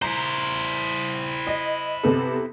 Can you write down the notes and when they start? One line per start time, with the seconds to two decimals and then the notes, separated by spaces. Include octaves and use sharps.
0.02 E4 C5 A#5
1.47 D#5
2.03 C3 B3 A4